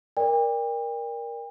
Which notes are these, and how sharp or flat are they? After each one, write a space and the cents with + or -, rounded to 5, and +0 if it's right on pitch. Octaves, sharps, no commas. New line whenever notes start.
A#4 +15 D5 +0 G5 +40